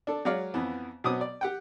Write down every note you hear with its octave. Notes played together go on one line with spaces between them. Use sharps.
D4 A4
F#3 G#3 C#5 D5 F5
F2 E3 B3
B2 F#3 B3 C4 D6 D#6
D5
G4 F#5 G5